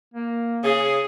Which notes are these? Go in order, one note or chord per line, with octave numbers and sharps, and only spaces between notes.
A#3
C#3 G#4